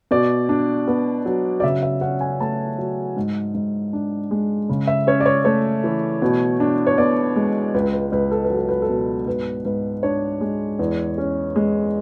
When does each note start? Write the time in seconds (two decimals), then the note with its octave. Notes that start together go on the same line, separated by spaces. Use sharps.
0.11 B2 D5
0.49 D4
0.88 B3
1.26 F#3
1.60 D5
1.63 C#3 E5
1.83 E5
2.01 C#4 F#5
2.21 G#5
2.40 A3 A5
2.78 F#3
3.16 G#2
3.55 G#2
3.93 D4
4.31 G#3
4.69 C#3
4.87 E5
5.07 C#4 C#5
5.20 D5
5.26 C#5
5.45 A3 C#5
5.84 E3
6.22 B2
6.60 D4
6.87 C#5
6.98 B3 D5
7.36 G#3
7.74 C#2 B4
7.94 B4
8.12 C#2 B4
8.31 A4
8.45 B4
8.50 F#3
8.57 A4
8.69 B4
8.82 A4
8.89 B2
9.26 G#2 B4
9.65 G#2 B4
10.03 D4 C#5
10.41 G#3
10.79 E2
11.18 C#4
11.56 G#3